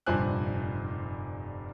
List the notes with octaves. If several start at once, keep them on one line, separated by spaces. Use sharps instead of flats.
F1 G2 A#2 C5 G#5 F#6